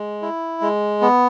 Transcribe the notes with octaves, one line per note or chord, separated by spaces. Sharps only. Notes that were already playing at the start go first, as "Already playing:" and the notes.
Already playing: G#3
E4
G#3
B3